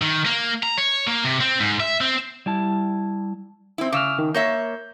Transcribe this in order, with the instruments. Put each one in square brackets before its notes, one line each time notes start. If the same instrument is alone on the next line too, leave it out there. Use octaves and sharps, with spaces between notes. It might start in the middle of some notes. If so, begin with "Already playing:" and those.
[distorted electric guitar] D#3
A#3
A#5
C#5
A#3
C3
C4
G#2
E5
C4
[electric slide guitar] G3 E4 A5
[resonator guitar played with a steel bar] C4 E4
[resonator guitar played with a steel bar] C#3 [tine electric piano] D6 E6 F6
[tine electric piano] D#3
[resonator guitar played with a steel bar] A#3 C#5 E5 [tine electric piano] G6